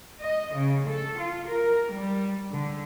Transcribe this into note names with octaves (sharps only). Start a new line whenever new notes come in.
D#5
C#3
A4
F4
A#4
G3
D3